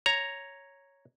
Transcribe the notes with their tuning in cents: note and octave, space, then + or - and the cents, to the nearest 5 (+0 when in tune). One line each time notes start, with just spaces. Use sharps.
C#5 +0 A#5 +0